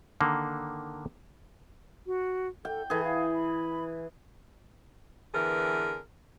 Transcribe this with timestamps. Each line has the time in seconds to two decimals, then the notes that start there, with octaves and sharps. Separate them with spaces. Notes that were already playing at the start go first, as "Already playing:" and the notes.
0.21 D3 D#3 A#3
2.07 F#4
2.65 A4 G5
2.90 E3 G#4 A4
3.05 F5
3.33 B5
5.34 D3 E3 B3 G#4 A#4